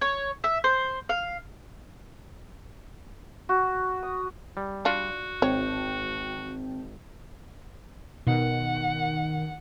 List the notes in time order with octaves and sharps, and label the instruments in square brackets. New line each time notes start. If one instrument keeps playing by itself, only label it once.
[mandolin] C#5
E5
C5
F5
[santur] F#4
D#6
[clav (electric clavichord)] G3
[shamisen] D4 F4 [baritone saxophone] F#4
[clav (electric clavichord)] G#1 [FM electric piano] C4 G5 A5 [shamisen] C#5
[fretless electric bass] B2 [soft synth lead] D#3 [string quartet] F#5